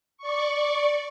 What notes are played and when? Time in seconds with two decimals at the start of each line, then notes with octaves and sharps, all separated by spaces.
0.18 D5 C#6